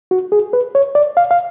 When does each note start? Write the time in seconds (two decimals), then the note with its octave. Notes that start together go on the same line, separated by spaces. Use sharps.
0.11 F#4
0.32 G#4
0.53 B4
0.75 C#5
0.95 D5
1.17 F5
1.31 F5